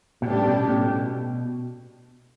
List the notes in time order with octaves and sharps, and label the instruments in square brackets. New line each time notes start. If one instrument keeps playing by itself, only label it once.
[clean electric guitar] B2
[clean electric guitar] A2 [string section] C#3 G3 B3 D4 G4
[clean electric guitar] B2
A2
B2